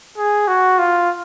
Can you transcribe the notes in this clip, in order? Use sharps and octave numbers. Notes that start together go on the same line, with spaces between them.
G#4
F#4
F4